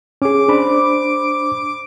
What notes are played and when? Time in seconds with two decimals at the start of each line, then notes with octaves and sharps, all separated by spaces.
0.22 C#4 G#4 D6
0.49 D4 C5 B5